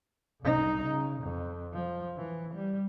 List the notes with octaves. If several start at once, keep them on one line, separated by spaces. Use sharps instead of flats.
C2 D#4
C#3
F2
F3
E3
G3